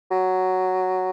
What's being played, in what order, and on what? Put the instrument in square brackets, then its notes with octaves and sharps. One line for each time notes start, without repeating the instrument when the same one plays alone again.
[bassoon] F#3